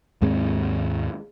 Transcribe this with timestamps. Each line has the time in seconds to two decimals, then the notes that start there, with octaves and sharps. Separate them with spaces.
0.22 D#2 G#2 G#3 C4